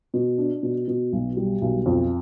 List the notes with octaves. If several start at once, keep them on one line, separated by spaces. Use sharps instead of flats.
B2
D4
B2
B2
B1
G3
B1
F2